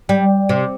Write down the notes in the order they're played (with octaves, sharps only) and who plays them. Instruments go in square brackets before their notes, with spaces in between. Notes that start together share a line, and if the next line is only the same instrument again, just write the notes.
[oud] G3
C3